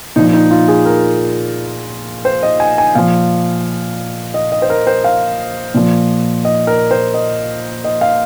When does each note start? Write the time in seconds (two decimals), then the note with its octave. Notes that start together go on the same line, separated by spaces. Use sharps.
0.16 A#2 F3 D#4
0.33 D#4
0.51 F4
0.68 G#4
0.86 A#4
2.25 C5
2.43 D#5
2.60 G#5
2.78 G#5
2.95 A#2 F3 F5
4.34 D#5
4.52 D#5
4.62 C5
4.70 A#4
4.87 C5
5.04 F5
5.74 A#2 F3
6.45 D#5
6.67 A#4
6.91 C5
7.14 D#5
7.84 D#5
8.01 F5